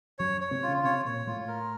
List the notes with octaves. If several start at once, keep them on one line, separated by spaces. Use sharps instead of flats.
F#2 F#3 C#5
C#5
C3 C4
F4
C#3 C#4
C3 C4 C#5
A#2 A#3 C#5
A2 A3 F4
A#4